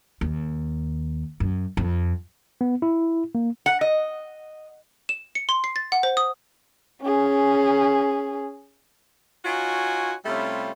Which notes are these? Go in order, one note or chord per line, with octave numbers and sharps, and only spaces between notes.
D#2
F#2
F2
B3
E4
A#3
F#5
D#5
E7
C#7
C6
C7
A6
F#5
C5
D#6
C#4 G#4
D#4 F4 F#4 C#5 G#5
C3 G3 A3 C#4 E4 F4